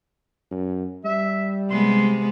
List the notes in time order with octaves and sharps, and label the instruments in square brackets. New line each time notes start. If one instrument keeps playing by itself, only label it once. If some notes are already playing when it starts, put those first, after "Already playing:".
[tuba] F#2
[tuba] G3 [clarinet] E5
[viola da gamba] C3 G#3 B3 [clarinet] C6